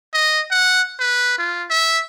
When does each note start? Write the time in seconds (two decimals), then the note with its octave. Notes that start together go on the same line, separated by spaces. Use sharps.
0.14 D#5
0.51 F#5
0.99 B4
1.38 F4
1.70 E5